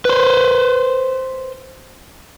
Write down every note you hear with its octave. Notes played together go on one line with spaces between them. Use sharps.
B4 C5